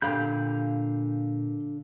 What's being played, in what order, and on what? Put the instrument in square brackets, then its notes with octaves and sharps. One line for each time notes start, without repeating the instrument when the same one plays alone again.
[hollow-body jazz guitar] A#2 G4 B5 [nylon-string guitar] D3 [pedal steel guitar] F5 G6